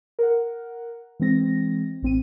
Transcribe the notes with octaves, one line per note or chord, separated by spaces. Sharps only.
A#4 F#5
E3 G#3 C4 A#6
A1 C4 D#7